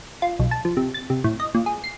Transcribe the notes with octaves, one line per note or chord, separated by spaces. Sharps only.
F4
B1
A5
F3
C3
A6
C3
A2
D#5
A#2
G#4
C7